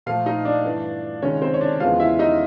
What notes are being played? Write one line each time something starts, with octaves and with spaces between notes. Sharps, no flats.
A#2 F3 A3 F4 F5
D#4 D#5
D4 D5
G2 E3 A3
C#2 C3 D#3 G#3 C#4 C#5
C4 C5
C#5
D4 D5
E2 C#3 F3 G#3 B3 F4 F5
E4 E5
D#4 D#5